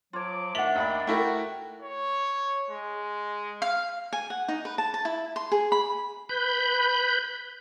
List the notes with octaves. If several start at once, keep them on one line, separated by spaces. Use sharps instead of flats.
F3 F#3 F4 C#5 D6
D#3 A3 D4 E5 F#5 F#7
D#2 D#4 D5 B5
A3 E4 F#4 A#4 G5
C#5
G#3
F5
G#5
F#5
D#4
B4
A5
A5
E4
C6
G#4
B5
B4 B5 G6